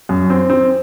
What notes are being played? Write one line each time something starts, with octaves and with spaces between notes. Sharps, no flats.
F#2
C4
C4